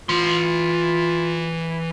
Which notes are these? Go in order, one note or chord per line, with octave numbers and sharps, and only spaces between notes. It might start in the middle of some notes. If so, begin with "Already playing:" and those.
E3 F4 C6